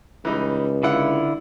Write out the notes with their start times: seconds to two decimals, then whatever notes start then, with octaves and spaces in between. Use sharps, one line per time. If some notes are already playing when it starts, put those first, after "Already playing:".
0.25 C#2 E3 G3 D#4
0.83 D3 E4 F4 F#5 E6